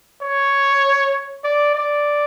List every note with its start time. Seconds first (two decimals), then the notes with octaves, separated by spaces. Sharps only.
0.22 C#5
1.44 D5
1.75 D5